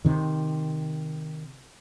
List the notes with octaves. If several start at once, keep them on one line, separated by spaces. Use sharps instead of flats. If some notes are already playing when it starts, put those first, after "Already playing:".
C3 D#3